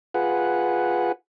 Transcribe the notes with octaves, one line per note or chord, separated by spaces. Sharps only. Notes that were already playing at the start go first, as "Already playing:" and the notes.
F4 G#4 B4 F#5